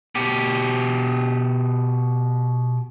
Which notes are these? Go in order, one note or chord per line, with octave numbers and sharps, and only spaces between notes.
B2 G4